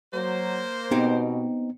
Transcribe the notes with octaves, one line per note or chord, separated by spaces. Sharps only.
F#3 A#3 C5
B2 B3 C4 D#4 G4